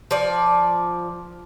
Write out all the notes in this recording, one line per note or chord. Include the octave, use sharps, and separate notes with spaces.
F3 D5